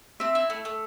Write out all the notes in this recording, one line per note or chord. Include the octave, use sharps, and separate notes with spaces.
C4 E5
E4
A3
A3